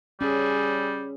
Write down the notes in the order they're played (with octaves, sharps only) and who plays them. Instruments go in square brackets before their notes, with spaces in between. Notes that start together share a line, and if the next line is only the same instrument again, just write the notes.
[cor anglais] G3 [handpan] C#4 [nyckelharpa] G#4